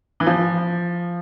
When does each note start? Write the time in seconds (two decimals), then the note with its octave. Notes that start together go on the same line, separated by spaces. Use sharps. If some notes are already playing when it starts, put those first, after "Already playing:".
0.20 E3
0.27 F3